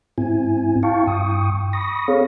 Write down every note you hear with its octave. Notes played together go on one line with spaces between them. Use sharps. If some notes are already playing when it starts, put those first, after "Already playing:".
G#2 C4 E4 G#5
E4 F5 G5 A5 C#6
G2 G5 C#6 D#6
B5 C#6 D#6 A#6
C4 G#4 A4 C#5 F5